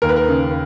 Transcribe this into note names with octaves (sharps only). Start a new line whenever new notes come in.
D#2 A#4
B4
A#4
C#3